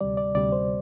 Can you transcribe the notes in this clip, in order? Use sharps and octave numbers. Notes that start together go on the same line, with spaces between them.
D2 C3 G3 D5
D5
D2 C3 G3 D5
C5